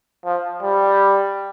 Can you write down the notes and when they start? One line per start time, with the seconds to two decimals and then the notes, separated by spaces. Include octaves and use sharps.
0.25 F3
0.63 G3